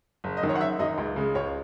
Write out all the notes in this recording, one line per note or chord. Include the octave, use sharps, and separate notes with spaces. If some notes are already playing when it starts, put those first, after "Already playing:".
F#1
D#5
F#2 D#3
C#5
F#5
F#1 E5
F#2 D#3 D#5
C#2
C#3 G#3
C#2 C#5